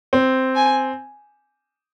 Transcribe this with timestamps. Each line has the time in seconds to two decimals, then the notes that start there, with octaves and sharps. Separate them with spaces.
0.13 C4
0.56 G#5